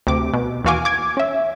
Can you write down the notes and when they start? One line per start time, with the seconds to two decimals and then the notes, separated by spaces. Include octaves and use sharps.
0.07 D2 C3 D6
0.34 B2
0.64 D#2 E3 F#4 F5 G#5 D6
0.85 D6 G#6
1.17 C#4 E5